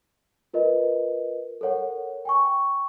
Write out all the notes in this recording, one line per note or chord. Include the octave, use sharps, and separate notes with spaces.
F4 A#4 B4 D#5
A4 A#4 C#5 F#5
G5 G#5 C#6